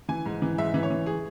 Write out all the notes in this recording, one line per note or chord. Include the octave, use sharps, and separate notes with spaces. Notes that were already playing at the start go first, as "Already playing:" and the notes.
E3 G#5
G#2
E3
G#2 E5
E3
C#5
E3
G#4